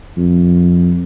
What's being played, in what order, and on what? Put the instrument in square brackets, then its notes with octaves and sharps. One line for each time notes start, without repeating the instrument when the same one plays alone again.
[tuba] F2